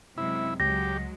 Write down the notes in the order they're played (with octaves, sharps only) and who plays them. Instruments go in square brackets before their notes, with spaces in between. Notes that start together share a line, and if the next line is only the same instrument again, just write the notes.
[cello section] F#2 C3 G#3 [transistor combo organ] E4
[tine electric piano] C#2 [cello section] F#3 G#3 [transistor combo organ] G4 [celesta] A#6